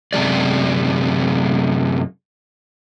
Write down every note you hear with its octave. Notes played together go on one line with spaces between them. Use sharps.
F#2 C3 E3 G#3 D5